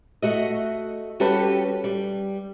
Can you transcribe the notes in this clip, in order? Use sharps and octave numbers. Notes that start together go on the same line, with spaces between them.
A3 F#4 D#5
G3 C#4 F#4 G4 A4 B4
G3